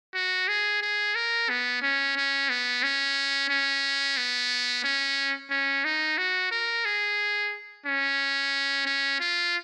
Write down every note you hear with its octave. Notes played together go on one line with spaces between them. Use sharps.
F#4
G#4
G#4
A#4
B3
C#4
C#4
B3
C#4
C#4
B3
C#4
C#4
D#4
F#4
A#4
G#4
C#4
C#4
F4